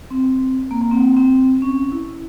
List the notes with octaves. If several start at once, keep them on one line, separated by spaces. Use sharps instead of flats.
C4
A#3
A#3
C4
C4
C4
C#4
E4